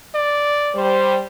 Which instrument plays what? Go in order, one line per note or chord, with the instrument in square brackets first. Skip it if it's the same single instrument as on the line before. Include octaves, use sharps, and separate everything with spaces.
[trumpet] D5
[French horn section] G3 C5